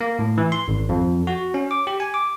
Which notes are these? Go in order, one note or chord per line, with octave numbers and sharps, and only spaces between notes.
A#3
A2
E3
C6
G#1
F2
F#4
C#4
D6
G4
G#5
D6